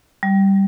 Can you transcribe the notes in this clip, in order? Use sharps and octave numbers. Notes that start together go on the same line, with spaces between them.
G3